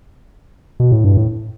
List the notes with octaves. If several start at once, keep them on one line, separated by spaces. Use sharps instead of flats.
B2
A2
G2
A2